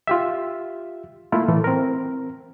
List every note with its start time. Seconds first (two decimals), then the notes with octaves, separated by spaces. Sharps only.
0.07 F4 G4 E5
1.32 A3 A#3 E4 F4
1.48 A2 E3 A3
1.64 C4 A#4